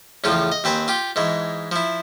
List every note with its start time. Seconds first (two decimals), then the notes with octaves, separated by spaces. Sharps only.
0.24 E2 A2 C#3 F3 F4
0.52 D#5
0.64 D#2 C4 B4 G#5
0.88 F4 G4
1.16 G#2 E3 G#3
1.72 F3 E4